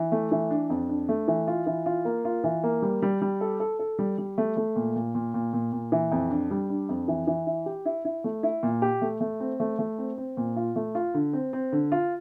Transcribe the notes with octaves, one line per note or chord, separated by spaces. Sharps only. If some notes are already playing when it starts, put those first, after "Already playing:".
Already playing: E3
A3
E3
D4
F2
D4
A3
E3
F4
E3
F4
A#3
F4
E3
A#3
G3
G3
G3
A4
A4
A4
G3
G3
A3
A3
A#2
A#2
A#2
A#2
A#2
A#2
E3
F2
D4
G3
D4
F2
E3
E3
E4
G4
E4
E4
A3
E4
A#2
G4
A3
A3
C4
A3
A3
C4
C4
A#2
F4
A3
F4
D3
C4
C4
D3
F4